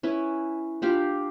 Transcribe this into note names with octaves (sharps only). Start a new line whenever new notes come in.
C#4 E4 B4 G#5
D4 F4 G4 F5